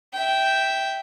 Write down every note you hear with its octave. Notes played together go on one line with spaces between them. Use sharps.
E5 G5